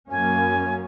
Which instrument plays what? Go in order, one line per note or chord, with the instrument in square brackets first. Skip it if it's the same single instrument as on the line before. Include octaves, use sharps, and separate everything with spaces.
[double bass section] F#2 A#3 C#4 [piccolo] G#5